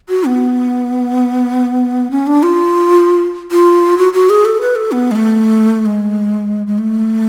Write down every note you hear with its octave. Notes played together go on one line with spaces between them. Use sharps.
F#4
B3
C#4
D4
F4
F4
F#4
F#4
G#4
A4
B4
A4
B3
G#3
A3
G#3
G#3
A3